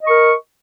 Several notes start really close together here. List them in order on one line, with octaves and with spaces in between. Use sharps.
D#5 C#6 A#4